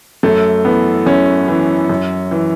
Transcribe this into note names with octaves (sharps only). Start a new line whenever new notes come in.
F#2 A3
E3 B3
F#2 C#4
E3
F#2
E3